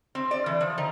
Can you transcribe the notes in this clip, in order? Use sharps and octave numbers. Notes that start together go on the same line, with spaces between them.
C4
D5
E3
F3
D#3